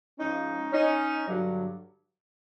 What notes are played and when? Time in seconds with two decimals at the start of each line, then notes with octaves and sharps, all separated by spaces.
0.19 G#2 F3 G#3 C#4 D#4
0.73 C#4 D#4
1.28 G2 D3 F#3